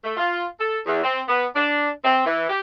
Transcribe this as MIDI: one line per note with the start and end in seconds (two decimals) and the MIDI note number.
0.04 0.15 57
0.17 0.45 65
0.59 0.78 69
0.86 1.02 40
1.04 1.21 60
1.28 1.45 59
1.54 1.89 62
2.05 2.22 60
2.26 2.46 52
2.49 2.60 67